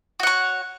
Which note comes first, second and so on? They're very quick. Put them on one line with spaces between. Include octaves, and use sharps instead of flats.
F#4 F#5 C#5